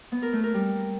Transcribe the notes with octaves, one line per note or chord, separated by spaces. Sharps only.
B3
A#4
A3
A#4
G3